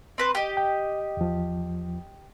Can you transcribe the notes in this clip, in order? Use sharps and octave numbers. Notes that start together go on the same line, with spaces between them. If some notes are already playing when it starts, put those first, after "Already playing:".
C4 B4 C5
G4 D#5
G5
E2 F3